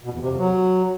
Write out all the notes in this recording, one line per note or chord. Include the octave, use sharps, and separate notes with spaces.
B2
E2
C3
F2
F#3